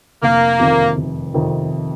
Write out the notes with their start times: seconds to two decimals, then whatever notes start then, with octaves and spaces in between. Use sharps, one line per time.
0.22 F1 A#3
0.60 F2 C3 D#3
0.97 F1
1.34 F2 C3 D#3